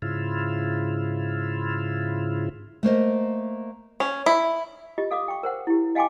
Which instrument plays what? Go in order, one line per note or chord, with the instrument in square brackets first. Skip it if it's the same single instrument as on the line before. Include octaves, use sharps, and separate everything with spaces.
[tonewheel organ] G#2 C#3 E4 F4
[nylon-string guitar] A3 A#3 C5 D#5
[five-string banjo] C#4
E4
[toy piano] F4 G4 D#5
A4 F5 D6 D#6
G5 C#6
A#4 C5 F#5
E4 G4
D#5 F5 G5 G#5 C6 D6